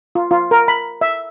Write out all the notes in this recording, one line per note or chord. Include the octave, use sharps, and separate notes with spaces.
F4
F4
A#4
B5
E5